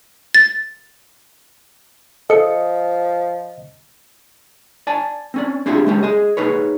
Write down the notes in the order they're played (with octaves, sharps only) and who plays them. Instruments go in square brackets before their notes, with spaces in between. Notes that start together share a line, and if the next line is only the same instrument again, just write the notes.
[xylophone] A6
[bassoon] F3 [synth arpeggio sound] A4 C#7 [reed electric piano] D#5
[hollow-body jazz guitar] D5 G#5 A5
C4 C#4 D5
C4 D4 E4 F4 G4 G#4
G#3 C#4 G4
G#4 D#5
D#4 G#4 B4 C#5